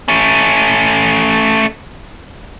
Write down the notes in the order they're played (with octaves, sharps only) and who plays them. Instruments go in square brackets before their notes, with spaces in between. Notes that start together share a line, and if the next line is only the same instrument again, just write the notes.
[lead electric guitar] A3 C#4